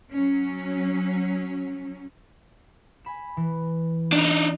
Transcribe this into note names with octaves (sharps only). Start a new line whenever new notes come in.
F#3 C#4
G#5 B5 E7
E3
D4 D#4